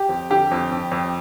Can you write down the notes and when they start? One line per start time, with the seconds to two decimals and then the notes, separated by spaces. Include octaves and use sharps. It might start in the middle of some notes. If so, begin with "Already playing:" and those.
Already playing: G4
0.09 F2
0.30 D3 G4
0.51 F2
0.71 F2
0.91 F2